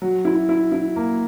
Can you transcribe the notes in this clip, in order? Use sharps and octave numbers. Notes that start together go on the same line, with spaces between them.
F#3
E4
E4
E4
A#3